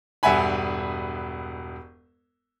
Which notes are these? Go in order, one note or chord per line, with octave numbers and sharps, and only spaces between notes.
E1 G2 E5 F#5 G#5 B5